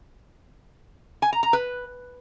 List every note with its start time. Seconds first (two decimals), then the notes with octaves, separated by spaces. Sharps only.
1.22 G#5
1.33 A#5
1.43 A#5
1.53 B4